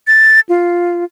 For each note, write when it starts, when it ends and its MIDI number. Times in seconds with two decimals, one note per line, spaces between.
0.07 0.40 93
0.49 1.04 65